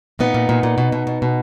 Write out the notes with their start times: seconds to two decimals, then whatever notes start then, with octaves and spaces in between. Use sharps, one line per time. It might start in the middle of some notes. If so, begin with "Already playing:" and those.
0.19 A#2 B3 D#4
0.34 A#2
0.49 A#2
0.63 A#2
0.78 B2
0.92 B2
1.07 B2
1.22 B2